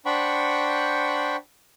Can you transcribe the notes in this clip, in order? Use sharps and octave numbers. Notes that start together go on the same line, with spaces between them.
D4 C5 F#5 G5 B5 C#6